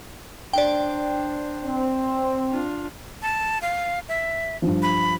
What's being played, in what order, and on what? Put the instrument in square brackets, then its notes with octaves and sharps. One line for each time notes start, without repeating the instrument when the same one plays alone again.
[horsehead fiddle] D4 C5 [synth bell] D5 G5
[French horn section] C4
[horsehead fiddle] D4 F4
[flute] A5
F5
E5
[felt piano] G2 F3
[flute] B5